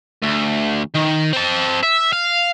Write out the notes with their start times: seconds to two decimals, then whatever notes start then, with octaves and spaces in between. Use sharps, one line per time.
0.22 D2
0.95 D#3
1.33 C4 A5
1.83 E5
2.13 F5